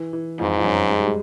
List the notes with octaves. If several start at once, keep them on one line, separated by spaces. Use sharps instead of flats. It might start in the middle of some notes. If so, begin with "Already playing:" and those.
Already playing: E3
E3
F2 G#2 F3
F3
F#2 F#3
G#3
G3
G#3